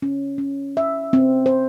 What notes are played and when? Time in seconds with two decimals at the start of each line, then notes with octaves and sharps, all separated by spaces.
0.02 C#4
0.38 C#4
0.77 E5
1.13 C4
1.46 C5